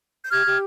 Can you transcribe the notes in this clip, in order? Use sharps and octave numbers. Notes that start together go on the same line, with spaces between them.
G6
G4 F6 G#6
G4